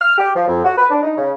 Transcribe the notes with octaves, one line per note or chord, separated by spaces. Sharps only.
F6
G4
F3
F2
F#4
B4
D4
D#4
C#3